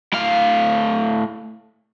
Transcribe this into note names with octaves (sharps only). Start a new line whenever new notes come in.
A2 F5